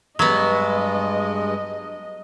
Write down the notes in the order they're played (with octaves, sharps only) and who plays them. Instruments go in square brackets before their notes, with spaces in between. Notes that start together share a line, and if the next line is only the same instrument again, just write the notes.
[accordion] G2 G#3 [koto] F#3 B3 [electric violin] D#5